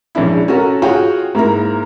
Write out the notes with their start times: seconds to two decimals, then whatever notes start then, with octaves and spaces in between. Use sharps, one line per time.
0.15 A#1 G#3 C#4 D4 E4
0.48 C#4 F#4 A4 A#4
0.82 F4 F#4 G#4 C#5 G5
1.35 G#2 A#3 E4 A#4